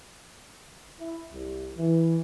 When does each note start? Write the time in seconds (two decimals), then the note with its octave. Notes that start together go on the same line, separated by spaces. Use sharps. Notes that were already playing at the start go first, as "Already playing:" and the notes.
1.00 E4
1.31 C2
1.78 E3